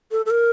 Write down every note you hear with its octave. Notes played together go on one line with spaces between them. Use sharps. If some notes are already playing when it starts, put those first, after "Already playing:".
A4
A4
A#4